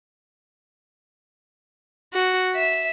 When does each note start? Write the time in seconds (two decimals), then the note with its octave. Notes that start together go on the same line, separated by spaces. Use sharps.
2.14 F#4
2.55 E5